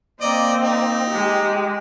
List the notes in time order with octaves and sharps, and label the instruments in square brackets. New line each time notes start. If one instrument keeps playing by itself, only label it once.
[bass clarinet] A#3 [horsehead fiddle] C4 [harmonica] D5 D#5
[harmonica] D#4
[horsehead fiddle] G#3 G4